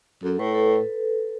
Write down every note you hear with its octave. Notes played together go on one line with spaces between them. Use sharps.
F#2 A4
A2 B4
A4